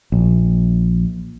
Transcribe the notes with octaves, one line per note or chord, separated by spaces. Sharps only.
A#1